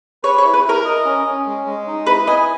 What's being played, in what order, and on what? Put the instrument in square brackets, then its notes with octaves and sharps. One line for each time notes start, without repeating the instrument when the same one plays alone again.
[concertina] B4 [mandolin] C#5
[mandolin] C#5
[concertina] E4
[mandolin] B4
[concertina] E4 [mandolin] A#4
[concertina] D#5
C#4
C#4
G#3
G#3
D#4
[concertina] E4 [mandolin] B4
[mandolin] D#5 [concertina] G#5